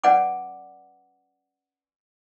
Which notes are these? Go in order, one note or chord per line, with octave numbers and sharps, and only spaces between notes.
C#4 B4 D5 F#5 G#5 D6